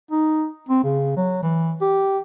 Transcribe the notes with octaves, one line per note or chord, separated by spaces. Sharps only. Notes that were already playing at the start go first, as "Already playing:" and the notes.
D#4
C4
C#3
F#3
E3
G4